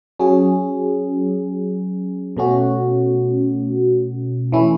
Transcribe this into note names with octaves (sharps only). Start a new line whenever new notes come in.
F#3 C#4 G#4
B2 A3 C#4 F#4
E3 A3 C#4 E4